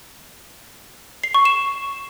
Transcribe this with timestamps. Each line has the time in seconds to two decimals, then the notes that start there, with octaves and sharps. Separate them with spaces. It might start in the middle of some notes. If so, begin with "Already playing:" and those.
1.24 C7
1.34 C#6
1.45 E7